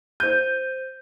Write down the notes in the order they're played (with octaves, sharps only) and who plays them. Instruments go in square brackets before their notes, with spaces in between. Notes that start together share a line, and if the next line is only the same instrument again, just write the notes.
[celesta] C5 D#7 [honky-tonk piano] G6